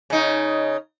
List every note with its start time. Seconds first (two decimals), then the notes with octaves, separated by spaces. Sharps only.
0.10 C#3 D#4